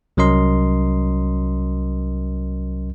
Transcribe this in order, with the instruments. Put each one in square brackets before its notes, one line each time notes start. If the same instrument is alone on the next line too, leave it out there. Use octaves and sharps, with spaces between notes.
[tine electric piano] C2 F#3 C#4 A#4 D#5 C6